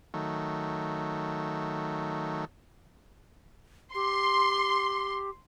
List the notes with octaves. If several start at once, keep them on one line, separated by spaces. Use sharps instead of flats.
D#3 F#3 A3
G4 C6